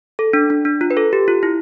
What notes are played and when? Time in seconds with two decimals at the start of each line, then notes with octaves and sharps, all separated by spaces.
0.19 A4
0.33 D4
0.50 D4
0.65 D4
0.81 F4
0.91 B4
0.97 A4
1.13 G4
1.28 F4
1.43 E4